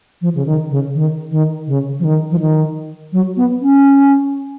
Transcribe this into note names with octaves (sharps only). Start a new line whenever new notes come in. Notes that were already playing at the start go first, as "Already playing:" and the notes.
F3
C#3
D#3
C#3
D#3
D#3
C#3
F3
D#3
F3
D#3
F#3
B3
C#4